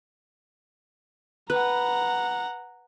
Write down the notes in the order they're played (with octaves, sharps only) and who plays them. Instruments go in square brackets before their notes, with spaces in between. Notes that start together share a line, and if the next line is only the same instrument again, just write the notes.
[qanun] B4 [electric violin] F#5 A#5